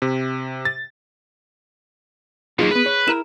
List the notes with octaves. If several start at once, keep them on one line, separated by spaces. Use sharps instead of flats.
C3
A6
D#3 F#3 A#3 D#4 F4 G#4
A3 B3 B4
C#5
E4 A#4 E7